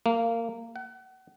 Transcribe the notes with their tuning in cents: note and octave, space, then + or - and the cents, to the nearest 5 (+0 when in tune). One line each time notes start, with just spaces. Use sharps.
A#3 -20
F#5 +35